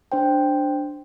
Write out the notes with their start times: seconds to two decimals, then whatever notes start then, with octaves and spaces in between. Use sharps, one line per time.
0.12 D4 C5 G5